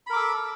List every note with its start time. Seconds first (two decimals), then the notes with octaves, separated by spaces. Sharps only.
0.07 B5
0.10 A#4
0.13 D6
0.16 A4